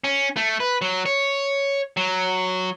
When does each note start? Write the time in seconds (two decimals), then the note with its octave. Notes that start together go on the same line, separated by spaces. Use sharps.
0.04 C#4
0.36 A3
0.60 B4
0.82 F#3
1.06 C#5
1.97 F#3